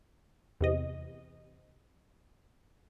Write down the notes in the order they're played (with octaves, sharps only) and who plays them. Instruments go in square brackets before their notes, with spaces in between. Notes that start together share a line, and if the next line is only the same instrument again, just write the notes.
[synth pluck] E2 C3 D#5